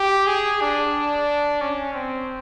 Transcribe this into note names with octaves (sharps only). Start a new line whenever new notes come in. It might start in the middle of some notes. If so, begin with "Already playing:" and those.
Already playing: G4
G#4
D4
C#4
C4